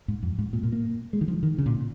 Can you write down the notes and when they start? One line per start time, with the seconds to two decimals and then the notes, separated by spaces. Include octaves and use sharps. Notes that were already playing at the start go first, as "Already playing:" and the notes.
0.08 G#2
0.23 F2
0.38 G#2
0.53 A#2
0.63 A#2
0.72 A#3
1.13 G#3
1.21 D#3
1.28 F3
1.43 D#3
1.58 C#3
1.66 A#2